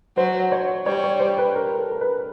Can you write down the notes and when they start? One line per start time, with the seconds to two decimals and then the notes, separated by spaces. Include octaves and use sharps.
0.17 F#3 C5
0.52 C#5
0.86 G3 C#5
1.04 C#5
1.20 C5
1.38 B4
1.55 A#4
1.78 A4
1.92 A#4
2.01 B4